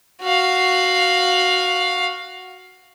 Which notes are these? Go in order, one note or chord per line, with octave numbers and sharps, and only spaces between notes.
F#4 F5